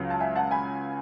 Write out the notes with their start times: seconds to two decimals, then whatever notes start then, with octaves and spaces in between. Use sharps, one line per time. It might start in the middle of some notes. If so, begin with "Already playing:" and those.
Already playing: C#2 C#3 F#3
0.10 A5
0.20 E5 G#5
0.35 F#5 A5
0.51 G#5 B5